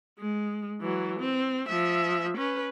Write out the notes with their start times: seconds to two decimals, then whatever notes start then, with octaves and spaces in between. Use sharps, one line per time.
0.19 G#3
0.81 E3 F#3
1.19 C4
1.69 F3 E5
2.37 C#4 B4